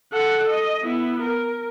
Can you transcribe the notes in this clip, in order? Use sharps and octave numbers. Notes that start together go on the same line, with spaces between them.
A4 F#5
D#5
B3 E4
A#4